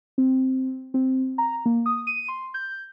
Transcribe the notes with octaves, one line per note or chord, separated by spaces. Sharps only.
C4
C4
A#5
A#3
D#6
D#7
C6
G6